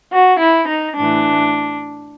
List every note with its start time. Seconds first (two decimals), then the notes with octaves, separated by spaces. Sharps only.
0.12 F#4
0.40 E4
0.68 D#4
0.96 A2 E3 D4